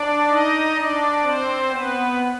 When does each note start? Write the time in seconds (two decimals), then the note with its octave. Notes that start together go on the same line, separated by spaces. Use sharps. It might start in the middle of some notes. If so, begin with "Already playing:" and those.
Already playing: D4 D5
0.29 D#4 D#5
0.76 D4 D5
1.22 C4 C5
1.69 B3 B4